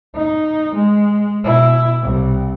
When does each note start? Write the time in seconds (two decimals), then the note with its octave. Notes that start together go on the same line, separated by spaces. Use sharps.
0.15 D#4
0.74 G#3
1.44 B2 E4
2.02 C2